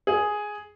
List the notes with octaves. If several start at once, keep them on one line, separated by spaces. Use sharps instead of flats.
G#4